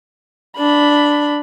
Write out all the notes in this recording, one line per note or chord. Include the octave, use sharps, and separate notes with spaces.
D4 B5